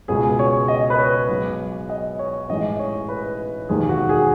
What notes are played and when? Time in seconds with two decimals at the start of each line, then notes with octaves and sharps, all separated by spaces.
0.08 C#2 B2 G#3 G#4
0.39 C#5
0.68 D#5
0.90 B4
0.98 C#5
1.29 B1 B2 G#3
1.89 D#5
2.19 C#5
2.49 A1 G#2 E3 G#3 D#5
2.79 C#5
3.08 B4
3.69 E1 D#2 D#3 G#4
3.89 F#4
4.09 G#4